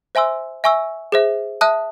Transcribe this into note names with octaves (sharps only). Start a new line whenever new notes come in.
C5 E5 G#5 C6 E6
E5 G#5 C#6 E6
G#4 C5 E5
E5 A5 D#6 F#6